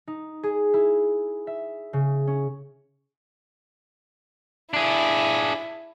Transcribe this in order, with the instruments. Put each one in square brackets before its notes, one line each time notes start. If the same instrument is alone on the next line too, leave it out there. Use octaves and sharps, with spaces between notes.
[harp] D#4
G#4
E4
E5
C#3
C#4
[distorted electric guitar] D4 G#4 [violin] E4